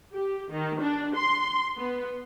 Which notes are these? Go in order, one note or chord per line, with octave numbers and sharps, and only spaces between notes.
G4
D#3
D4
C6
B3